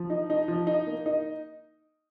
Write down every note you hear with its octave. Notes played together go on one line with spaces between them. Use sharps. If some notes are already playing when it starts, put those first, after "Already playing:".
Already playing: F3
D#4
D#4
F3
D#4
A#3
D#4